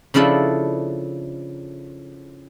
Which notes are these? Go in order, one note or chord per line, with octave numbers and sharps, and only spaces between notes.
C#3 F3 D4 E4 A4